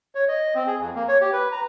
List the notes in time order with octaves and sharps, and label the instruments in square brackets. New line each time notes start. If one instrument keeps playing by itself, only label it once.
[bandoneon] C#5
D#5
C4
G#4
F2
A#3
C#5
G4
B4
A#5